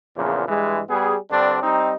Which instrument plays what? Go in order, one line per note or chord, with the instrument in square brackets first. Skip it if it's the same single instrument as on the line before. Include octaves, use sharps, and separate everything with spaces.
[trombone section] A#1 E2 A#2 C#3 F3
G2 E3 G#3
G3 B3 G#4
G2 D3 C4 D4
G3 C4 D#4